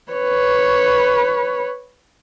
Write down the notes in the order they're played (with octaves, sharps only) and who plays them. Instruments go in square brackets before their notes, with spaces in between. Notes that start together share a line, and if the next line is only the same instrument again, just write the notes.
[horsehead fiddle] B4 C#5